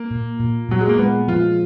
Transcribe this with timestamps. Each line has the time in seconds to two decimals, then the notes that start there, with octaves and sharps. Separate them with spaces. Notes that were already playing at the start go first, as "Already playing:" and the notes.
Already playing: A#3
0.11 A#2
0.40 A#2
0.69 A#2 F#3
0.81 G#3
0.89 A#3
0.98 G#3 B3
1.28 F3 F4